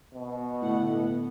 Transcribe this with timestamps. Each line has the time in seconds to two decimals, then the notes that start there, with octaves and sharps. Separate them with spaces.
0.14 B2
0.62 A2 D3 A3 F#5
0.95 B3